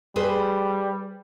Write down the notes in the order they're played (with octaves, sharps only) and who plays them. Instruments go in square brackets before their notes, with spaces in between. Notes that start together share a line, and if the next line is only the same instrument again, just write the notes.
[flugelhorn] G3 [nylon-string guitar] G#4 B4 C5